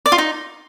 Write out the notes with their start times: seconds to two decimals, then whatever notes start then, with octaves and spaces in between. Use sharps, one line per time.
0.06 D5
0.12 F4
0.18 D#4